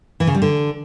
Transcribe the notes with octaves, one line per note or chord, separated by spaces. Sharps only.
E3
C#3
G3
D3